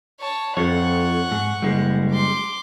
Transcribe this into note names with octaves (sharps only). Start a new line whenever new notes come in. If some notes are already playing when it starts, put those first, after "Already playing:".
C#5 A5
F2 A4 C#5 F#5 C#6
G#2
F#1 G3 G#3
C6 D6